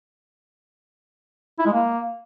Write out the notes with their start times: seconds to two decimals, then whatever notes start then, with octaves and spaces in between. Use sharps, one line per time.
1.59 E4
1.66 G#3
1.73 A#3